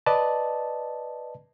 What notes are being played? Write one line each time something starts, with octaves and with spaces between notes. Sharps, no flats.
B4 D5 D#5 A5